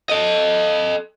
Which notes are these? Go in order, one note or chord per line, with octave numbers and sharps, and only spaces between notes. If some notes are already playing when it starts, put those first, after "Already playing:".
A4 D#5